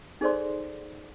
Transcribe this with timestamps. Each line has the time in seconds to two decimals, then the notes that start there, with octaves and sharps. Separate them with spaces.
0.21 D#4 G#4 A4 C5 D5 C6